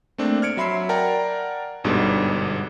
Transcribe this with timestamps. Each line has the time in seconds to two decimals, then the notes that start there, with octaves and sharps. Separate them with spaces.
0.18 A3 A#3 C4 D4
0.42 F6 G#6 C#7 D7
0.57 F#3 E5 B5 C6 C7
0.89 A#4 D5 F#5 G5 A5 A#5
1.84 G1 G#2 B2 D3 G3